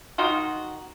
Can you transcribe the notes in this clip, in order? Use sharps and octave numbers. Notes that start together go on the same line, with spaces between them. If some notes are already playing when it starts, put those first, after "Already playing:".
D#3 D#4 F#4 C6